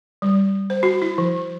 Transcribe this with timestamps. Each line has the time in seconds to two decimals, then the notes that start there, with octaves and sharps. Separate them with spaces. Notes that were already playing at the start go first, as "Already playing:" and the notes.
0.22 G3
0.70 C5
0.83 F#4
1.02 E4
1.18 F3